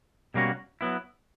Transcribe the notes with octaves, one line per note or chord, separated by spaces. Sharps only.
B2 G3 A#3 C#4 F#4
F#3 B3 E4